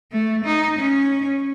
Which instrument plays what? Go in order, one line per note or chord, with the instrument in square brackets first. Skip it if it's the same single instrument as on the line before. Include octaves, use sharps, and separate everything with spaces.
[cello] A3
D#4
C#4